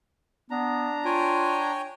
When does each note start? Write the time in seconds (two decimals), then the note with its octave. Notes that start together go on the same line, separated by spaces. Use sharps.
0.50 B3 D4 A#5
1.05 F4 C#5 G5 G#5